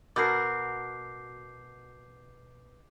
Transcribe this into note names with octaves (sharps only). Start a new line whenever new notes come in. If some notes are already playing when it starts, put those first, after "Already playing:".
B2 F#4 A#4 D6 G6 C7